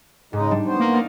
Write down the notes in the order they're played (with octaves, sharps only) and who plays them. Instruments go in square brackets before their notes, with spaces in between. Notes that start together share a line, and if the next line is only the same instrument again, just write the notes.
[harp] G#2 [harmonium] C#3 G#3 D#4
[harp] G3 D4
[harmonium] B3 C5 [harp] C#4
[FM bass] A#3
[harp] D#4 D5 F5